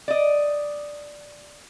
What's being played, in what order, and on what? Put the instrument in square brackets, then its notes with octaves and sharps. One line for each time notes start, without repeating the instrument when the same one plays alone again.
[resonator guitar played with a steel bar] D5 D#5